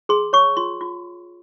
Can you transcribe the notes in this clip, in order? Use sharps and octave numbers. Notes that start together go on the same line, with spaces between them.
G#4 C6
C#5 C#6
F4 C6
F4